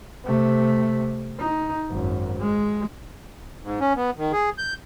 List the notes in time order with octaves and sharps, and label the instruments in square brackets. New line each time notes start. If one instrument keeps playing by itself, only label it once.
[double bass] C3 A3
D#4
G#1 F#2
G#3
[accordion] G#2
C#4
B3
D#3
G#4
G6